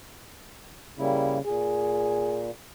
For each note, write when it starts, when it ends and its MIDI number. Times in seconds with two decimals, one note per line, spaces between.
0.99 1.43 49
0.99 1.38 55
0.99 1.38 58
0.99 1.38 64
1.45 2.51 46
1.45 2.52 68